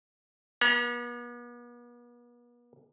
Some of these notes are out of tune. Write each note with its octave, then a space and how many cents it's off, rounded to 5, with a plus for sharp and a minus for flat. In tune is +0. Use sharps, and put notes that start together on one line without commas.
B3 -40 A#5 +25